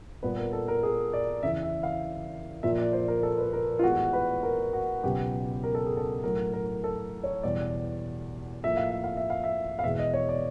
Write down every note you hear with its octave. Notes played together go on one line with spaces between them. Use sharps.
A#2 G3 B3 B4
A#4
A4
A#4
G#4
D5
E2 C#3 E3 E5
E5
F5
A#2 F3 A#3 E5
D5
C5
A#4
A4
B4
A#4
F4
A2 E3 G#3 B3 F#4
B4
A#4
F#4
C#2 B2 F#3 B3 G4
A#4
A4
G#4
A4
A2 F#3 A3 A#4
A#4
A4
C#5
E2 B2 G3 D5
A2 F3 A#3 E5
F5
E5
F5
E5
F5
E5
F5
E2 B2 G#3 E5
D#5
C#5
D5